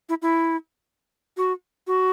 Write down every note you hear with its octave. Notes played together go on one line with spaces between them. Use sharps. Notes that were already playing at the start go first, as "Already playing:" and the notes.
E4
E4
F#4
F#4